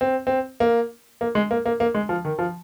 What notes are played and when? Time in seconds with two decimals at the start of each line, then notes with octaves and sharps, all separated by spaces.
0.01 C4
0.27 C4
0.60 A#3
1.21 A#3
1.35 G#3
1.51 A#3
1.65 A#3
1.80 A#3
1.95 G#3
2.09 F3
2.25 D#3
2.39 F3